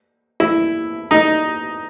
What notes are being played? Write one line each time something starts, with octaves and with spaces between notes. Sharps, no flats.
E4
D#4